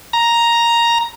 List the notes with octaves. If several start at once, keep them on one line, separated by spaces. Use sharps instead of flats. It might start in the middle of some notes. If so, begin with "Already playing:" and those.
A#5